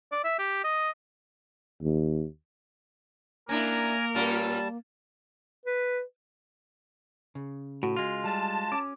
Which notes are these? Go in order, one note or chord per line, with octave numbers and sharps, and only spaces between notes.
D5
E5
G4
D#5
D#2
A#3 C#4 D4 E4 A#4 G#5 A#5
A#2 G3 C#4 F4 A5
B4
C#3
A2 F#4
G#3 F4
G3 G#4 A5
C#4 D6